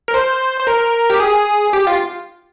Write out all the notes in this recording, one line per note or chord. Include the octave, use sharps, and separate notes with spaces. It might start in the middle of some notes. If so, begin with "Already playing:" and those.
A#4
C5
C5
A#4
G4
G#4
G4
F4